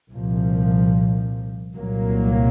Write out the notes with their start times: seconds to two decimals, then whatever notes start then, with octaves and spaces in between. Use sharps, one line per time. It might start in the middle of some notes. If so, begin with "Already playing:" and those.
0.12 C2 A#2 F3
1.76 C2 A#2 F#3 A#3